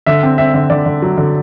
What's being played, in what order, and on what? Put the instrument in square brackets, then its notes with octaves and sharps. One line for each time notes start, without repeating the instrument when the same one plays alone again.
[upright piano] D3 E5
C4
C4 E5
D3
D3 D5
D3
F#3
D3